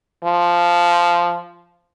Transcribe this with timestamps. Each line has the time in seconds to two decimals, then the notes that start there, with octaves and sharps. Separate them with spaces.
0.25 F3